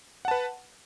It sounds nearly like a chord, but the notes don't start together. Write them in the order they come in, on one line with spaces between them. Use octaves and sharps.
F#5 A5 B4